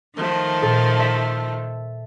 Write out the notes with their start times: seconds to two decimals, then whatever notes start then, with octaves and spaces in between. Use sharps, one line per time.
0.16 D#3 F3 A3
0.62 A#2 A4
1.00 E5 B6